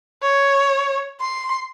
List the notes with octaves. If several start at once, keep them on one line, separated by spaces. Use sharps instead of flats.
C#5
C6